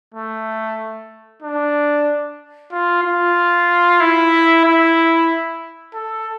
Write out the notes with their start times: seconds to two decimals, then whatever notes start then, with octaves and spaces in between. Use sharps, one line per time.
0.14 A3
1.43 D4
2.72 F4
3.04 F4
4.00 E4
4.65 E4
5.94 A4